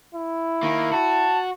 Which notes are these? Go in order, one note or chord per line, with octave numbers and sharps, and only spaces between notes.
E4
D#3 A#3
F#4 A5